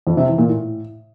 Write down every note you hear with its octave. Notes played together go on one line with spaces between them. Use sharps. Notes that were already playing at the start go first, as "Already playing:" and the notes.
F2
C3
E3
A#2
A2